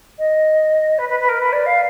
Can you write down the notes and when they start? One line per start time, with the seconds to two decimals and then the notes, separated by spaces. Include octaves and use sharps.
0.18 D#5
0.98 B4
1.08 B4
1.19 B4
1.28 A#4
1.39 B4
1.52 D5
1.65 F5